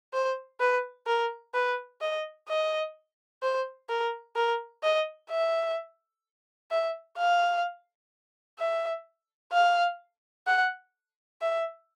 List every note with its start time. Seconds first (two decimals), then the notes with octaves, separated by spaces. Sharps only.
0.14 C5
0.61 B4
1.07 A#4
1.55 B4
2.01 D#5
2.49 D#5
3.43 C5
3.89 A#4
4.36 A#4
4.83 D#5
5.31 E5
6.71 E5
7.18 F5
8.59 E5
9.53 F5
10.47 F#5
11.42 E5